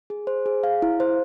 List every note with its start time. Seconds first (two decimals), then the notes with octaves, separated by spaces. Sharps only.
0.10 G#4
0.27 C5
0.46 G#4
0.63 F5
0.82 E4
1.00 C5